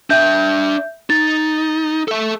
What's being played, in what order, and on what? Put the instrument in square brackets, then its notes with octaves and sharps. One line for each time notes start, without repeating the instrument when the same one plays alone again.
[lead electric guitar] D4 G5 [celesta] E5 G6
[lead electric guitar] D#4 [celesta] A6
[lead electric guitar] A4 E5